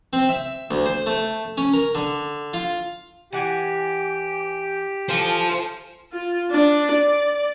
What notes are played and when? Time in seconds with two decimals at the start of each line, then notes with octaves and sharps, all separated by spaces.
0.13 C4
0.29 E5
0.71 D2
0.86 C5
1.06 A3
1.58 C#4
1.74 A#4
1.95 D3
2.54 F4
3.32 E3 G4 F#5 G#5
5.09 E3 F4 A4 C5
6.13 F4
6.52 D4
6.93 D5